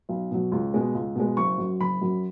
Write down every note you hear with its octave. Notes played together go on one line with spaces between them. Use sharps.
B1
B2 F#3
C#2
B2 G#3
C#2
B2 G#3
F#1 C#6
F#2 F#3
F#1 B5
F#2 F#3